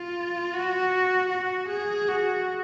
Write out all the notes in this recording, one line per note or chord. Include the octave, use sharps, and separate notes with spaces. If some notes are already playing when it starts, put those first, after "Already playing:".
Already playing: F4
F#4
F#4
G#4
F#4